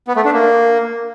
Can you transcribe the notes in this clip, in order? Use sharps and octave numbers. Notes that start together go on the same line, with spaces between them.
B3
A3
D4
A#3